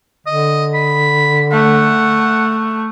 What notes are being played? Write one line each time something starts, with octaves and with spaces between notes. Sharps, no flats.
D3 D#5
B5
A3 F#5